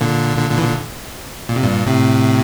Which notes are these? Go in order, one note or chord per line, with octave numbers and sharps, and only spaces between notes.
A#2 D3
A#2 D3
A#2 D3
E3
A#2 D3
A#2
C3
G2 A#2
A2 C3